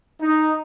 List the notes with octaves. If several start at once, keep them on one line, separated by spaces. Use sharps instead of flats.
D#4